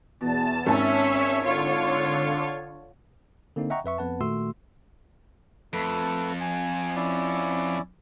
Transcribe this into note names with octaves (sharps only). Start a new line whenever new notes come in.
E2 B2 A5
G#1 C#4 C#5 E5 A5
D3 F4 C#5
D3 A#3 C4 D#4
D#5 E5 F#5 G5 A#5 C#6
F2 B4 E5 C#6
F2 B3 B4 F#5 A5
A#2 D#3 A3 F#4 C6 E6
F2 A3 A4 B4
G#5
C#4 E4 D5